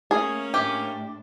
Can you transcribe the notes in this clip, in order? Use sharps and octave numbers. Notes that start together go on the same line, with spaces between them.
A3 A#3 C#4 G#4
A2 D4 G4